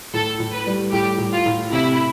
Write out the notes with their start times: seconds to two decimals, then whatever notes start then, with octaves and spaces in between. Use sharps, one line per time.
0.14 A2 A4
0.40 A2
0.53 B4
0.67 G3
0.92 A2 G4
1.18 A2
1.33 F4
1.46 A2
1.72 C3 E4